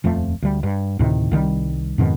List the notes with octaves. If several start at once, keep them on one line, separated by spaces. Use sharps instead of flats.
D#1 F2 F3 A3
D2 G3
G2
D2 A2 C3 D#3
C2 D#3 E3 G3
F2 G#2 B2 D#3